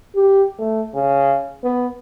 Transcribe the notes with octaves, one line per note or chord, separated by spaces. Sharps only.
G4
A3
C#3
B3